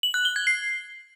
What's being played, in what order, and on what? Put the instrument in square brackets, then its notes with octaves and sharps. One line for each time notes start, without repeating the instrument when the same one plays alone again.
[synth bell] F#7
F#6
G7
G#6
C7